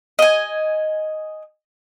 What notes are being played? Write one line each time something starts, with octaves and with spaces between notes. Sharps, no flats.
D#5 G#5